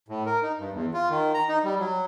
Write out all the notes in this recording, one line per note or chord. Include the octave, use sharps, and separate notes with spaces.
A2
A#4
D#4
G2
E2
F4
D#3
A#5
D#4
G3
F#3